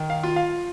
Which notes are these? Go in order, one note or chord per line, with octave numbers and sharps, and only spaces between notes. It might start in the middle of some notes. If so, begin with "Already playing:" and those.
Already playing: D#3
F5
F4
F5